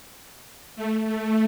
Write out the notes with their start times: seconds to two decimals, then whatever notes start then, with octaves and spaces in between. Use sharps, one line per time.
0.76 A3
1.05 A3